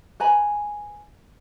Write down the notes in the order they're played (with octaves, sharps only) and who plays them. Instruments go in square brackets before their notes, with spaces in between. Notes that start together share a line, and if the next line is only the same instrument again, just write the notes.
[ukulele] B4 G#5 A#5 B5